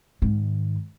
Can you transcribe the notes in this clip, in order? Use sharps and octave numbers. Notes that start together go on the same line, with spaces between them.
G#2 D#3